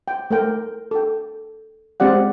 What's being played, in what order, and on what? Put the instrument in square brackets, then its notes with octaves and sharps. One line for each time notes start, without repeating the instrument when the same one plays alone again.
[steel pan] G5
A3 A#4 G5
A4 G5
G#3 C4 G4 D5 F#5